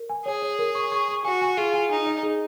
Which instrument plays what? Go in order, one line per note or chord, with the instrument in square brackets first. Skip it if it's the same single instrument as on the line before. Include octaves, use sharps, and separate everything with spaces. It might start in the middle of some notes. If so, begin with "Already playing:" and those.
Already playing: [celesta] A#4
G#5
[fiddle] G#4 [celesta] C#5
[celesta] C#5
A#4
C#6
C#6
C#6
[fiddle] F#4 [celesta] G#5
[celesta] G#5
[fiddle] F4 [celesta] G#4
[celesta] G#5
[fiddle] D#4 [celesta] G#5
[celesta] D#5
G#4